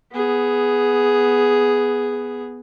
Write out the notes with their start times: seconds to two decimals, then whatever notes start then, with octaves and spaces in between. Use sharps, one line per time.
0.13 B3 G#4